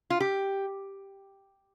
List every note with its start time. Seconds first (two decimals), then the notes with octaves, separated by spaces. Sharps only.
0.10 F4
0.20 G4